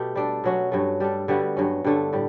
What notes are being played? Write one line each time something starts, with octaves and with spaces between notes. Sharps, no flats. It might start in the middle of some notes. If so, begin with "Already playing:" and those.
Already playing: B2 A3 G4
G3 D4 A4
B2 F#3 C#4 F#4
G2 F#3 A3
G3 D4 A4
D3 G3 B3 F#4
G2 F#3 C#4
G2 D3 A3
A2 G3